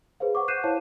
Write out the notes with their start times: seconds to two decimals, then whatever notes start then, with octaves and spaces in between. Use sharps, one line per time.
0.20 G#4 B4 C5 F5
0.35 C5 F#5 C#6 D6
0.48 F#6 G6 C7 D#7 E7
0.64 E4 C5 C#5 F5 A5